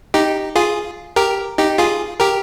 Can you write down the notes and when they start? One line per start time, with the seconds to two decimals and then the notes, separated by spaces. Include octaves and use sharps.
0.14 D#4 G4
0.56 F4 G#4
1.16 G4 A#4
1.58 D#4 G4
1.78 F4 G#4
2.20 G4 A#4